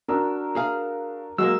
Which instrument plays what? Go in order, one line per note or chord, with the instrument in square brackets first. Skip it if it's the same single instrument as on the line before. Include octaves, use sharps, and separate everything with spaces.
[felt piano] D4 F#4 E6 [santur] A#4
[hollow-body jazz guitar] G#4 F5
[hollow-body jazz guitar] F#3 G#3 A#3 [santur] F#4 G#4 D#5 [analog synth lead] E6